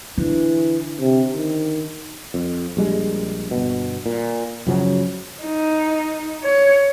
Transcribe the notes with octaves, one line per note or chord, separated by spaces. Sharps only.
D3 E3
C3
D#3
F2
A#1 G3 G#3
G1 B2
A#2
F#2 C#3 F3 F#3
D#4
C#5